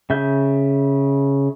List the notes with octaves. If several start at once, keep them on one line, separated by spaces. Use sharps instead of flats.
C#3 E5 G6